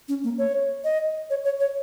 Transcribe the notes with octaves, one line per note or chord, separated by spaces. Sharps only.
C#4
A#3
C#5
D#5
C#5
C#5
C#5